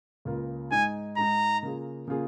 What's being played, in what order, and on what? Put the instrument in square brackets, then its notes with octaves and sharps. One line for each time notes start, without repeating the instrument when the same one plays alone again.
[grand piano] C#2 C#3 A#3 F4 A#4
[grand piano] G#2 G#3 D#4 [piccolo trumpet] G#5
[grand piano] G#2 G#3 D#4 [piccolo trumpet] A#5
[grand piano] C#3 A#3 F4 G#4
C#3 A#3 F4 G#4